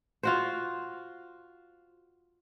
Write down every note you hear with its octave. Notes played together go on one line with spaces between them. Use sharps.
F4 F#4 C5